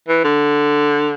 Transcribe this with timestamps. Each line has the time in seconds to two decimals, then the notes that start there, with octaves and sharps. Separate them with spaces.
0.08 E3
0.24 D3